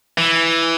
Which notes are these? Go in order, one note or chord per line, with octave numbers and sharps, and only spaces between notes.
E3